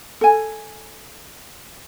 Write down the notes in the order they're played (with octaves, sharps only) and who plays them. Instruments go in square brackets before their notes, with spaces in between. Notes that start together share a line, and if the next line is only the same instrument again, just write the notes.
[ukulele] A4 G#5